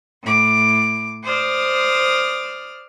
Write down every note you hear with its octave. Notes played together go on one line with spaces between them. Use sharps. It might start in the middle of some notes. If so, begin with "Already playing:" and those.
A2 D6
C5 D5 D#6 F6